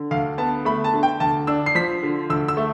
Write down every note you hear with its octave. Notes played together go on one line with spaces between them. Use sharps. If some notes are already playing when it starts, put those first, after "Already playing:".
Already playing: D3
D2 F5
B3 A5
A3 B5
A5
D3
G5
D2 A5
D4 E6
C7
F3 B6
D3
D2 E6
E6
A3